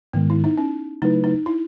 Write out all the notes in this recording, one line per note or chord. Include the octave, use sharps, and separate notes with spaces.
G#2 D#3 G#3 B3
E4
D#4
C#4
C#3 F#3 A3 D#4 E4 B4
D#4
E4